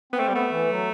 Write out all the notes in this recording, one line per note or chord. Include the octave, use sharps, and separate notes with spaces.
B3 C4
A3
G3
A3 B3
E3
F#3